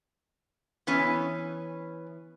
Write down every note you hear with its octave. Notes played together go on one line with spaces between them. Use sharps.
E3 B3 C#4